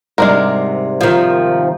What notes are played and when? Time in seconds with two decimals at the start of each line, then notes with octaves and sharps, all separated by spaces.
0.18 G#2 C3 G3 G#3 D4 A#4
1.01 D#3 F3